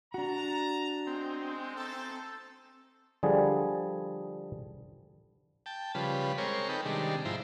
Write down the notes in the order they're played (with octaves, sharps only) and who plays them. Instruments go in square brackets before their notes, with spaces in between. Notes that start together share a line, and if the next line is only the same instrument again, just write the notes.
[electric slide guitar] D4 F#4 [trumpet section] A5 A#5
[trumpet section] G#3 [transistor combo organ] C4
[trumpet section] A3 D#4 A4
[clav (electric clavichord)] D3 F3 G3 G#4
[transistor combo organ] G5 A5
C#3 F3 G3 B4
G#3 C4 A#4 C#5
D#4 A4 B4 G5
C3 D#3 G3 G#3 D4
G#2 F3 E4 C5 A#5